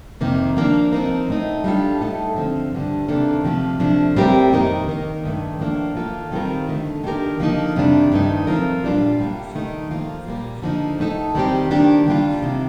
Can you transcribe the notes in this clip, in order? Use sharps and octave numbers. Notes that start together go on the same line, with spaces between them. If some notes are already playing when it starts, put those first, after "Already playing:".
F2 C3 D#3 A#3
F3 A#3 D4
F3 C4 D#4 A#4
A2 A3 D#4
G3 D4 F4 A4
A2 A3 D#4 A4
D3 F3 C4
G2 D3 G3
C3 D#3 A#3 D4 A4
C3 F3 A3
C3 F3 A3 D4
A2 G3 C4 G4 A#4
F2 D#3 A#3 D#4 A#4
D#3 A#3 D#4 A#4
G2 D#3 A3
A2 F3 A#3 D4
D#3 A#3 F4 A4
D#3 G3 C4 F4 A#4
D3 A3 D#4
D#3 A#3 D4 G4 A#4
D3 F3 A#3 D#4
F2 C3 D#3 G3 D4
G2 D#3 A3 D#4
F3 C4 F4 A#4
A#2 G3 D4 F4
A2 G3 A#3
D#3 A3 D#4
F3 A#3 F4
A#2 G3 A#3
D3 F3 A#3 D#4
A2 A3 D#4 A4
D#3 G3 C4 G4
D#3 A#3 D4 G4
D3 G3 A#3 D4 F4
C3 D#3